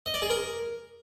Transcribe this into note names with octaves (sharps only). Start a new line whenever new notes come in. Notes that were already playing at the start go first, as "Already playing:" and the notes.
D#5
D5
G#4
A#4